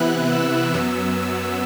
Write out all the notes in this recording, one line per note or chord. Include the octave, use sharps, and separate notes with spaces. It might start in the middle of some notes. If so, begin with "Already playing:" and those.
Already playing: C3 E3 B3 E4 F#6
E6
F#2 F#3 B3